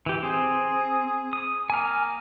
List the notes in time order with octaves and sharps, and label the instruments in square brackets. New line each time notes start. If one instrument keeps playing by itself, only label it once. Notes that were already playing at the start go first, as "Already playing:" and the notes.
[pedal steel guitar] E3 G4
[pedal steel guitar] C4 [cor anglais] G#4
[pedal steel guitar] D#6
[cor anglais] A#3 [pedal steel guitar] G#5 F6